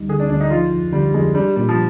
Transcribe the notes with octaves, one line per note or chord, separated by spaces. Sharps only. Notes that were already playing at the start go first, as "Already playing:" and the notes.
Already playing: D2 G3 D#4
D3 G#4
D4
D2 D4
D#4
F3 F4
F2
D3 G3
F2 G#3
G3 D4
A#2 G3
F3